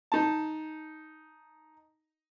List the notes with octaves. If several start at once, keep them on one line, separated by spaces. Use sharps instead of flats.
D#4 A5